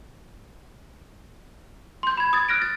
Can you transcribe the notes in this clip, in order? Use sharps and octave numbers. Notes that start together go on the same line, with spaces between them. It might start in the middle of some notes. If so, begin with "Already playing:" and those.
C6 G6
B5 G#6
D#6 G#6 A6
F6 F#6 A#6 D7
A6